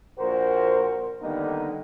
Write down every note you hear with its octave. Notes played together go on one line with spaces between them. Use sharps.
A#1 F#4 A#4 C5
D3 D#3 G3 A#3 B3 D#4